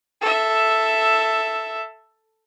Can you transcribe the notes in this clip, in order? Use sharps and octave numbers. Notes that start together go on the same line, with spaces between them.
A4 E5